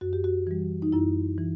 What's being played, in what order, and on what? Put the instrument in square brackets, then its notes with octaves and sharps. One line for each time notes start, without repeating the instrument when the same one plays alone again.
[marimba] F#2 F#4
G4
F#4
E3 G3
D#4
F#2 E4
E3